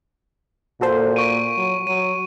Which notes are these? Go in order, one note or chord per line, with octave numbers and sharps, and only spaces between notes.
A#2 F#4 A4 C5
C#6 D7 D#7
F#3
F#3 D#7